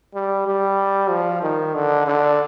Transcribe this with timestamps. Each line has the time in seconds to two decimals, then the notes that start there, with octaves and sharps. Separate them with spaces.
0.14 G3
0.47 G3
1.10 F3
1.42 D#3
1.74 D3
2.07 D3